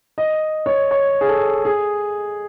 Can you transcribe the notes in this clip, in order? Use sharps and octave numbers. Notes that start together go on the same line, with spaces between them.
D#5
C#5
C#5
G#4
A4
G#4